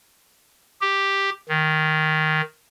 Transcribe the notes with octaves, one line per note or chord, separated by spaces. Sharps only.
G4
D#3